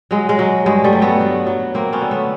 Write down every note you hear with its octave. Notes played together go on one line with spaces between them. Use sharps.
F#3 G#3
G#3
F#3
G2 G#3
G3 A3
F#3
A3 B3
F#3
F#3
F#3 A#3 C4
B3 C#4
D3
A3 B3